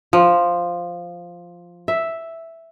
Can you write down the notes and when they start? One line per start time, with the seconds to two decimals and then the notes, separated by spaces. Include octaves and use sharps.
0.13 F3
1.88 E5